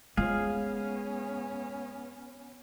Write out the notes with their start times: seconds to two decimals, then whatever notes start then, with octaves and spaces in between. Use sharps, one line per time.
0.17 G#3 B3 C#4 F4 G#4 F5